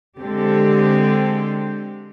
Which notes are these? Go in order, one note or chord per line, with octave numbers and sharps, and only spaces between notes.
D3 G#3 C4 G4